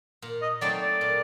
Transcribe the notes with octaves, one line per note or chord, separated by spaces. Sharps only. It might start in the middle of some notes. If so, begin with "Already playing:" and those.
A#2
D#5
F#3 A3 C4 D#4 D5
D5
A#2